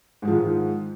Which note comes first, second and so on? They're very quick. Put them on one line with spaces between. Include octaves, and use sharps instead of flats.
G#2 G#3 F3 D#3